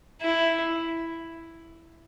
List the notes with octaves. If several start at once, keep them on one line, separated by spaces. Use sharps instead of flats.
E4